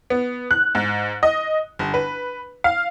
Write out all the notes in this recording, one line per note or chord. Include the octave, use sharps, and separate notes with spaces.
B3
F#6
G#2
D#5
G1
B4
F5